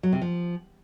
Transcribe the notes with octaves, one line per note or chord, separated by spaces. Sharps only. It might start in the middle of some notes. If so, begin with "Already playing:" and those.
F#3
C3
F3